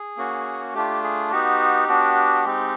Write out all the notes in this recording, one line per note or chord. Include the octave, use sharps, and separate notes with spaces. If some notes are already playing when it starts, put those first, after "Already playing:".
Already playing: G#4
A#3 C#4 F#4
A3 D4 F4 G4
G#4
B3 D#4 F#4 G4
B3 D4 F#4
G#3 C4 D#4